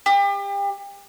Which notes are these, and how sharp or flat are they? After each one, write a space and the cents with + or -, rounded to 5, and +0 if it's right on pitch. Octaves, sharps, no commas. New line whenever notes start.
G4 +35